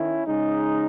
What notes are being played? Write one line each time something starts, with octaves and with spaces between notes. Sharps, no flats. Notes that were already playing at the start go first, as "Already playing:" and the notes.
Already playing: D#3 C#4 E4
C#3 G#3 D#4